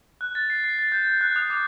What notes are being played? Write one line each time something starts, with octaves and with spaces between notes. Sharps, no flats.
F#6
A6
C7
C7
A6
G6
G6
F#6
D#6
D6